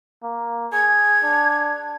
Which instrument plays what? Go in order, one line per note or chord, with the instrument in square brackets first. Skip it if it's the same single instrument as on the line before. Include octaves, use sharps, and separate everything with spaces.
[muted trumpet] A#3
[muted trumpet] G#4 [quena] G#6
[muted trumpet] D4